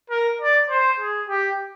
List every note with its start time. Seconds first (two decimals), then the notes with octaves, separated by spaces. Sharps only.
0.10 A#4
0.41 D5
0.70 C5
1.00 G#4
1.29 G4